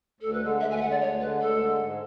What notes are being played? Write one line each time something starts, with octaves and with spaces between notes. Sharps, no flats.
D2 A4
B4
D3 G#3 A4
D2 E5
G#5
E5
D3 G#3 F#5
D5
D2 C#5
D3 G#3 B4
D2 A4
D3 G#3
G#2